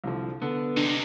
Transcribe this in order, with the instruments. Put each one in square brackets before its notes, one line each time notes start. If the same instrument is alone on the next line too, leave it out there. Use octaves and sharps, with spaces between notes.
[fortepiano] C2 D3 F3
[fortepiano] D3 [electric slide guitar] B3
[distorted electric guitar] C3 D#4 [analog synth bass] D4